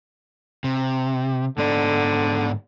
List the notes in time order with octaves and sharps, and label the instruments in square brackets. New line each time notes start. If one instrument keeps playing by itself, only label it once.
[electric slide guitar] C3
[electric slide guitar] G#2 B3 D5 [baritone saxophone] D3